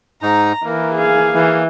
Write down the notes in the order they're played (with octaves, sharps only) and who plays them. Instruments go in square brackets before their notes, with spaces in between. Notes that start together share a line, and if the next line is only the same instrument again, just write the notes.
[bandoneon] G#2 D#4 [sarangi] A#5
[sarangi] E3 [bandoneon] A#3 [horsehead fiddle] A#4
[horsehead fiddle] G#4 F5
[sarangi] E3